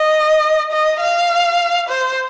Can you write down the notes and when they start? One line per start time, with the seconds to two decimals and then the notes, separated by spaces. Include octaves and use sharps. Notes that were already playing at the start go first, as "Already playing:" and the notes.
Already playing: D#5
0.71 D#5
1.00 F5
1.88 C5